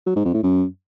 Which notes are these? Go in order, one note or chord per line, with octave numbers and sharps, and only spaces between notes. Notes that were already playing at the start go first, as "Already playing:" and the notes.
F#3
G#2
F2
A2
F#2